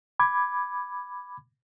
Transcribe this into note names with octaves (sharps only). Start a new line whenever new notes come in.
B5 D6 G#6